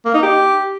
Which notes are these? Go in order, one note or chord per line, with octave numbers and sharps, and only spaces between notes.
A#3
D#4
G4